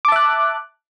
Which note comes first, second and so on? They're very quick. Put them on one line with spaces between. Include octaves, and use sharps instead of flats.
D6 A5 E5 F#6